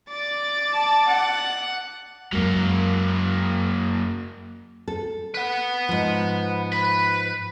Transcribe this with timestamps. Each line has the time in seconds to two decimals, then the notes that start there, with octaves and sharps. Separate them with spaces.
0.10 D5 A6
0.73 A5
1.06 F#5
2.33 F#2 F#3 G#3 A#3
4.88 A4
5.34 B4 F#5
5.89 G#2 F3
6.72 B4 B5